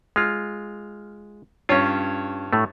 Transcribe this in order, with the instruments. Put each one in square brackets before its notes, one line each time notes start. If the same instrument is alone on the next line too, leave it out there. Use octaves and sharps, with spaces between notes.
[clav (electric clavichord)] G#3 F4 [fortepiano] F6
[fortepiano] G2 C#5 [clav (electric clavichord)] C#4 F4
[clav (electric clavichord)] A2 A3